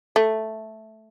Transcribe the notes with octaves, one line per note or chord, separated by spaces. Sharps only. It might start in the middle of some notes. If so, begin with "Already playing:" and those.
A3